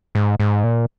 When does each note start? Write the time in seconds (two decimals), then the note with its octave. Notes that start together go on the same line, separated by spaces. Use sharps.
0.15 G#2
0.40 G#2
0.64 A#2